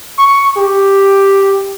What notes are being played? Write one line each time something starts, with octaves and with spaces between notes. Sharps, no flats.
C#6
G4